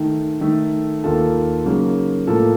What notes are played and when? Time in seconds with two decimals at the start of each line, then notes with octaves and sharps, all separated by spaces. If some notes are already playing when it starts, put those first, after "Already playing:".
Already playing: D#3 A3 D#4
0.41 D#3 A3 D#4 A4
1.04 D#2 D#3 A#3 F4 A4
1.65 C#3 F#3 A#3 D#4
2.27 A2 F3 A#3 F4 A4